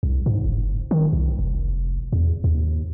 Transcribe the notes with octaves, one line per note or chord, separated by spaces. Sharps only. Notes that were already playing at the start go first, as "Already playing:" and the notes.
C2
G#2
F#1
D#3
C2
F1
E2
D#2